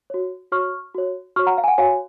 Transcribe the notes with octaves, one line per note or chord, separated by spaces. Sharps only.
F#4 C#5
F#4 C#5 C#6 F6
F#4 C#5
F#4 C#5 C#6 F6
F#5 A#5
F5
G#5
F#5
F#4 C#5 F5 G#5